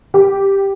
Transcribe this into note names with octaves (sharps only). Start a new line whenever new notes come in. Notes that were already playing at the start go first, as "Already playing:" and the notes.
G4